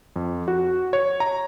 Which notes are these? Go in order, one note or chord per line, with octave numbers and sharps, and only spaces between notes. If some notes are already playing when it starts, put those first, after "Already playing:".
F2
F#4
C#5
A#5